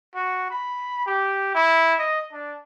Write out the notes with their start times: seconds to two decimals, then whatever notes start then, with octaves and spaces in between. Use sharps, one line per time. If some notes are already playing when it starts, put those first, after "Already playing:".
0.15 F#4
0.50 B5
1.06 G4
1.55 E4
1.99 D#5
2.32 D4